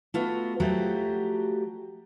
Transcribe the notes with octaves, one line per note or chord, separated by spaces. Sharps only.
A3 B3 F4 F#4
F3 F#3 A3 F#4 G4